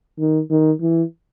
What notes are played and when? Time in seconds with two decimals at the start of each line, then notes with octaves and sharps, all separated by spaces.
0.19 D#3
0.50 D#3
0.81 E3